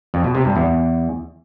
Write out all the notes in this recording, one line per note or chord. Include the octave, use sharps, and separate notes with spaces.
F2
B2
C3
G2
E2